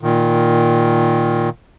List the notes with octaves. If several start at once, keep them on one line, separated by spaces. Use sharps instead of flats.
A#2 D#3